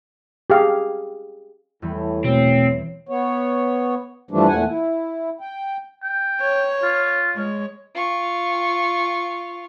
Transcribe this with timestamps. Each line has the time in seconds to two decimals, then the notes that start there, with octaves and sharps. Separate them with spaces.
0.50 G4 G#4 F5
1.82 E2 A2 E3 G3
2.24 B2 A3 C4 C#5
3.09 B3 C#5
4.31 G2 E3 F3 G3 A3 D4
4.48 E2 A#2 A3 F#5 G#5
4.66 E4
5.41 G5
6.03 G5
6.41 C#5
6.83 F4
7.35 G#3 C#5
7.95 F4 C#6